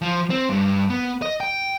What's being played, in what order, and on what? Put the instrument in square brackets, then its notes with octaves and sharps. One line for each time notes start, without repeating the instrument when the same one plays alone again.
[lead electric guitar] F3
C4
G2
B3
D#5
G5